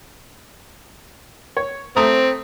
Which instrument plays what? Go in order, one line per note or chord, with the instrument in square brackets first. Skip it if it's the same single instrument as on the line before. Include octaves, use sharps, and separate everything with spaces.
[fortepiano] C#5
[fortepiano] A3 A#5 D#6 [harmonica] C4